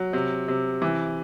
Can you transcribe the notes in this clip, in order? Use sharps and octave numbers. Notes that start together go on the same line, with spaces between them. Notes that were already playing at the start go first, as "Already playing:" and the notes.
Already playing: F#3
C3
C3
E3